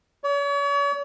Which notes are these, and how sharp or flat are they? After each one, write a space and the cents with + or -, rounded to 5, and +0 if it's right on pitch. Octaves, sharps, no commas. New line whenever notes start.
C#5 +40